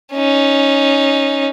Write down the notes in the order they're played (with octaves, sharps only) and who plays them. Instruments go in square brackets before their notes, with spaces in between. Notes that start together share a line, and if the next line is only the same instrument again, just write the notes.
[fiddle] C#4 D#4